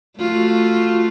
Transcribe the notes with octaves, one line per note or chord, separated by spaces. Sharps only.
A3 F4 F#4